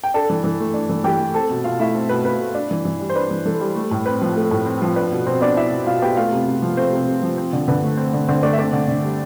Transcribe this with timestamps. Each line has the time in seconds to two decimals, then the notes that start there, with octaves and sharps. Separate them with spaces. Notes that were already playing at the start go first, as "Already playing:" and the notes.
0.04 G5
0.14 D4 A4 A5
0.30 E3
0.44 E3
0.60 A3
0.74 D4
0.89 E3
1.04 E3 G4 G5
1.19 A3
1.34 C4 A4 A5
1.50 B2
1.64 B2 F4 F5
1.79 A3 E4 E5
1.95 C4
2.09 B2 B4
2.24 B2 B4
2.40 A3
2.55 D4
2.71 E3
2.85 E3
3.00 G3
3.09 C5
3.15 D4 B4
3.31 E3
3.45 E3 A4
3.60 G3
3.75 A3
3.91 A2
4.06 C4 B4
4.22 F3
4.36 A3 A4
4.51 A2
4.66 C4
4.82 F3
4.96 D4 B4
5.12 B2
5.26 B2 C4 C5
5.41 B3 D4 D5
5.56 D4 E4 E5
5.71 B2
5.87 B2 F4 F5
6.02 B3 G4 G5
6.16 A3 F4 F5
6.32 C3
6.47 C3
6.62 F3
6.77 A3 C4 C5
6.93 C3
7.08 C3
7.23 F3
7.38 C4
7.53 D3
7.68 D3 B4
7.82 A3
7.97 C4
8.13 D3
8.28 D3 C4 C5
8.43 A3 D4 D5
8.53 E5
8.58 C4 D4 D5
8.73 D3
8.88 D3
9.03 G3